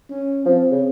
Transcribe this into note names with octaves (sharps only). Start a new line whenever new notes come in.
C#4
F3 C4
C#3